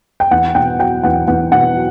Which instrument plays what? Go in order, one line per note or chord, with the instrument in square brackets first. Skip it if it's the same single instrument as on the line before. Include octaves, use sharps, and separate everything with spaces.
[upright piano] G5
E2 F#5
B2 G5
F#3 G5
E2 F#5
E2 F#5
B2 F#5
F#3